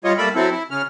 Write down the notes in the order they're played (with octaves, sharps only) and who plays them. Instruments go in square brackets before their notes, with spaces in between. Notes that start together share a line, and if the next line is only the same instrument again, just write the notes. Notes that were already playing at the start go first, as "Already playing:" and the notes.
[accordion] G3 F4 C#5 D#5
G3 A3 A#3 D5 E5 B5
F#3 C4 E4 A4
E4
C#3 C#4 F6